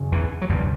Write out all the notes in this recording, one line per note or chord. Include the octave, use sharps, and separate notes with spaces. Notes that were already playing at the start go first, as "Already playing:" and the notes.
Already playing: F#2 C#3
E2 E3
F#3
D2 G2 C3 G3